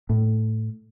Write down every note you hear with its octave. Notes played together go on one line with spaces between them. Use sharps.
A2